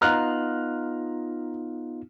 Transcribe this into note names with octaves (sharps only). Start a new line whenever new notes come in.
B3 D#4 F4 A#5 F6 F#6